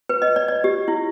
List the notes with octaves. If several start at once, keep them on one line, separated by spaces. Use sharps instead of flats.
B4
D#5
D5
D5
G4
E4